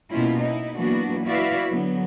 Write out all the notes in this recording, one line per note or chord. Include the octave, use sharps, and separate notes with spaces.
B2 A#3 C#4 E4 F4
D#4 E4
E3 F#3 A#3 B3 D4 F#4
E4 F#4 B4 D5 E5 F5
D3 F#3 B3